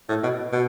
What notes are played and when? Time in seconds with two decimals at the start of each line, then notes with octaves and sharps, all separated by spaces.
0.09 A2
0.23 B2
0.53 B2